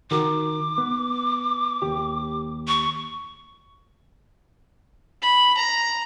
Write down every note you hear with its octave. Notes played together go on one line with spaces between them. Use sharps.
D#3 F#4 A#4 D6
B3
D#2 G4
C#6
B5
A#5